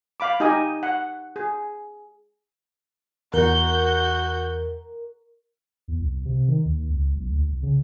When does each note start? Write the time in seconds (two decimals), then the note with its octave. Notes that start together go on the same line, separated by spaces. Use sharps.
0.20 F5 B5 D6
0.40 D#4 G4 D#5 G#5 D#6
0.83 F#5
1.36 G#4
3.34 E2 F#4 A#4 G6
5.88 E2
6.00 C2
6.25 C3
6.48 D#3
6.65 D#2
6.90 C#2
7.15 B1
7.28 D2
7.48 C2
7.63 C#3